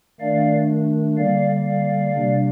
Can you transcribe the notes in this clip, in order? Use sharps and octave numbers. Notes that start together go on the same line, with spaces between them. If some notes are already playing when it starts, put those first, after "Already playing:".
D#3 A3 D4 D5 F5
D3 G3 A#3 D5 F5
D5 F5
C3 G3 A#3 D4